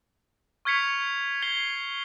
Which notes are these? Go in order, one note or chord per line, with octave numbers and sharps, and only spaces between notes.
C#6 F6 G#6 B6 C#7 F7
G#6 C7 G7